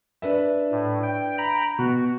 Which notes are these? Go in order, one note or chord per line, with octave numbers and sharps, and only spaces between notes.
D4 B4 E5
A2
G5
G5 A#5 B5
B2 F#4